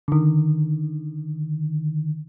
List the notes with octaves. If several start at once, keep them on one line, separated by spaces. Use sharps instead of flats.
D3 D#3